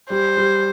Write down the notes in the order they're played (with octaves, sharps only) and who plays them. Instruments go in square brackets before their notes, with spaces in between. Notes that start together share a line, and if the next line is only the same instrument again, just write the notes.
[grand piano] G3 [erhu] C5
[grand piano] G3